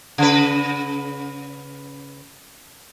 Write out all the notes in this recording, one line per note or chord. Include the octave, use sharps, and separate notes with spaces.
C#3 B4